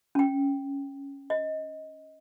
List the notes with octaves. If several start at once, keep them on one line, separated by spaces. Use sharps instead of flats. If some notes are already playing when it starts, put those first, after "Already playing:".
C#4 G5
D#5